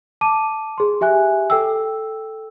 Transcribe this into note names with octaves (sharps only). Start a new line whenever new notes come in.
A5 D6 D#7
G#4 C6
G4 E5 G#5 F#6
A4 G5 E6